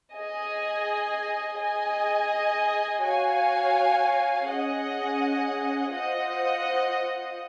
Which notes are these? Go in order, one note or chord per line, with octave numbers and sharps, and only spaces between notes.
G#4 D#5 G#5
G#4 D#5 G#5
F#4 C#5 F5 G#5
C#4 G#4 D#5 F#5
F4 C5 D#5 F#5